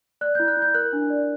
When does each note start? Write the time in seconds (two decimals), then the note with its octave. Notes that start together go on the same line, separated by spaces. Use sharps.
0.21 D5 F#6
0.35 G6
0.39 E4
0.48 F#6
0.57 E4
0.62 G6
0.74 A#4 F#6
0.93 D4
1.10 D5